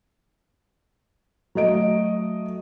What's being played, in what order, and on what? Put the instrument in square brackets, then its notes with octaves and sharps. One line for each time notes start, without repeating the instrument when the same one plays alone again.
[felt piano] F#3 A3 D#5 D7